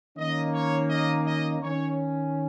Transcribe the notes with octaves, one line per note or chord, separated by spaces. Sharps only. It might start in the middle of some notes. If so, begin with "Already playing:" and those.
D#3 A#3 C#4 D#5
C#5
D#5
D#5
D#3 C#4 C#5